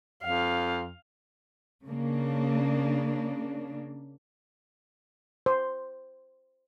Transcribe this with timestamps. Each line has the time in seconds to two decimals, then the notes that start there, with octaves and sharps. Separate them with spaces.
0.24 F2 F5
1.86 C#3 A#3 D4
5.46 C5